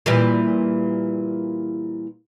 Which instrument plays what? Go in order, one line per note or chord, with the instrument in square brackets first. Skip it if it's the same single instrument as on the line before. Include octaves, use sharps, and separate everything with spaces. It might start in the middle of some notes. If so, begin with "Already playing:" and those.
[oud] A#2 E3 G3